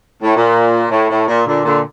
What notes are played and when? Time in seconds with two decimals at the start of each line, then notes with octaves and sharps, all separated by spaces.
0.23 A2
0.36 A#2
0.91 A2
1.10 A2
1.28 A#2
1.46 A#2 D3
1.65 A#2 D3